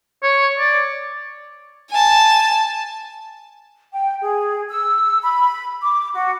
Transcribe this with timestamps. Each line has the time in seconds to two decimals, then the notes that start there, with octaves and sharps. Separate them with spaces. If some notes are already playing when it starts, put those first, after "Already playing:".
0.23 C#5
0.59 D5
1.90 G#5 A5
3.93 G5
4.22 G#4
4.70 E6
5.22 B5
5.82 D6
6.14 F#4